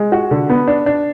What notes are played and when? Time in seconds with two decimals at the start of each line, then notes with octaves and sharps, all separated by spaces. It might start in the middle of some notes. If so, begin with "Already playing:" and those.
Already playing: G#3
0.12 F#4
0.31 D3
0.50 B3
0.67 D4
0.86 D4